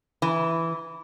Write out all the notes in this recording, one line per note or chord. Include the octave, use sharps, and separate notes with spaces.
E3